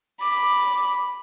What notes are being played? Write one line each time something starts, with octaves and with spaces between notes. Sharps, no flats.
B5 D6